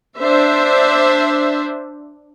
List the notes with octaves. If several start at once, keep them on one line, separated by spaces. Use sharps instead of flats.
D4 C5 E5